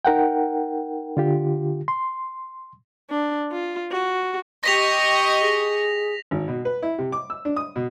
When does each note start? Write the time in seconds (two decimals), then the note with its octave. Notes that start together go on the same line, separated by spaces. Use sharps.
0.05 D#4 A#4 F#5 G5
1.17 D3 F4 G4
1.88 C6
3.11 D4
3.52 F4
3.91 F#4
4.64 G4 D#5 C#6 A#6 B6 F7
5.41 G#4
6.31 G#1
6.48 B2
6.65 B4
6.82 E4
6.98 C3
7.12 D6
7.30 E6
7.45 D4
7.56 D#6
7.76 B2